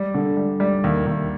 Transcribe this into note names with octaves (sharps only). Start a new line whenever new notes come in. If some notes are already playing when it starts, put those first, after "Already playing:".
Already playing: G3
D3
G3
G3
D#2
D#2